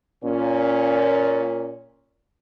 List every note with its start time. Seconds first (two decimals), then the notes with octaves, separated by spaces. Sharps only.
0.24 A#2 C#4